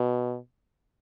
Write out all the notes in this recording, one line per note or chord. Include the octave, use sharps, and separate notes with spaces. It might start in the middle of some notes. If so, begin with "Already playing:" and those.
Already playing: B2